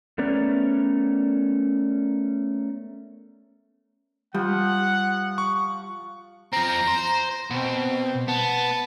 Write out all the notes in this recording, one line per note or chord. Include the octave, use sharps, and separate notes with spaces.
A3 B3 C#4 A#4 B4 D5
F3 G3 F#5
C#6
F3 C4 A#5
C5
B2 C4
B3 A5